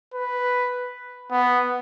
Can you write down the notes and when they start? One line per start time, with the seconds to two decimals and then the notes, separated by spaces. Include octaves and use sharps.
0.14 B4
1.32 B3